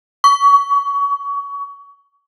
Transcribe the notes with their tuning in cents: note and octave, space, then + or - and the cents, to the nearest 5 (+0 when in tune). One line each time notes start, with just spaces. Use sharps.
C#6 +30